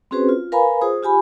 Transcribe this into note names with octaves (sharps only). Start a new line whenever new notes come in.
C4 C#4 F#4 G#4 B4 C5
F4
A#4 B4 F5 G#5 A#5 B5
F4 G#4 C5 D#6
F4 G4 G#5 B5